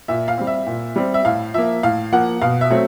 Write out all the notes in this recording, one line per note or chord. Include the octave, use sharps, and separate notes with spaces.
A#2 E5
F5
G3 C4
E5
A#2
G3 C4
E5
A2 F5
F3 A#3 E5
A2 F5
F3 A#3 F#5
B2 F5
E5
F#3 A3 C4